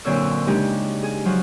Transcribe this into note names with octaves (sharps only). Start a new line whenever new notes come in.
F#2 A#2 D3 C4 C#5 E6
C#3 G#3 D4 D#4 G4
G#4
F3 F#3 F4